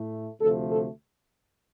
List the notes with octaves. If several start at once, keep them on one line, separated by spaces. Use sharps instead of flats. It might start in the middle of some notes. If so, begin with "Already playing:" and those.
Already playing: A2 A3
D2 C3 F3 A3 A4
A4